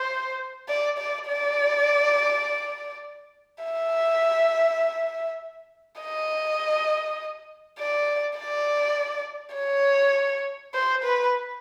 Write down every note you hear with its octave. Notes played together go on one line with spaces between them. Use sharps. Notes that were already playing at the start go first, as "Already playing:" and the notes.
Already playing: C5
D5
D5
D5
E5
D#5
D5
D5
C#5
C5
B4